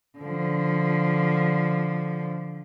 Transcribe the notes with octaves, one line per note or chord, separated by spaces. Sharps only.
D3 F3